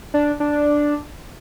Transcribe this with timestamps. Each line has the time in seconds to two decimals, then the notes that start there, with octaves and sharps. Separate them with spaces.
0.14 D4
0.40 D4